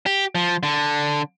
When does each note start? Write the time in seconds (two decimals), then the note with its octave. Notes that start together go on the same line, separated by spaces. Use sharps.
0.06 G4
0.35 F3
0.63 D3